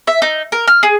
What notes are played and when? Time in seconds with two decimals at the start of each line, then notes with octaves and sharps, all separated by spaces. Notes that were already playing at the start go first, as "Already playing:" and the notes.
0.07 E5
0.22 D#4
0.52 A#4
0.67 F6
0.83 G#4